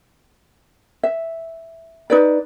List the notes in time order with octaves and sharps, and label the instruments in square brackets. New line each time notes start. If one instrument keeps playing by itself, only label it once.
[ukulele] E5
D#4 B4 D5